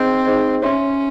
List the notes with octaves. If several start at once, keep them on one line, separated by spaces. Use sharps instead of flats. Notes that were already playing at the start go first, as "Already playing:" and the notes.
Already playing: C4 D#4 G#4 C5 D#5
D#4 G#4 C5 D#5
C#4 C#5 E5 C6